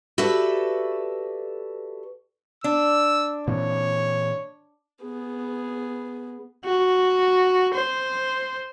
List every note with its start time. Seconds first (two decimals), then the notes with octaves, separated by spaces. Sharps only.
0.18 F#4 G4 A4 B4 D5 E5
2.64 D4 E6
3.47 A#2 E3 C4 C#5
5.02 B3 G#4
6.65 F#4
7.74 C5